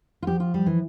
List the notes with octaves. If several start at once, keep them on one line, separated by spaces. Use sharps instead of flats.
F4
F3 G4
F4
G3
E3